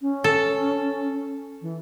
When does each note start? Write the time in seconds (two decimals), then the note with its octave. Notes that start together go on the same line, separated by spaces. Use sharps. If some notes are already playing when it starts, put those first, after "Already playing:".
0.01 C#4
0.24 A4
1.62 E3